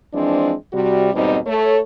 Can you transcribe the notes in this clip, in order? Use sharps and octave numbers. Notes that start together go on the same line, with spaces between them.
E3 F3 G#3 C4 D4
C3 G3 F#4
D#2 G#2 B2 G3 C4 D#4
A3 C#5